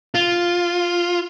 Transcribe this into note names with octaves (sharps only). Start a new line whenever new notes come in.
F4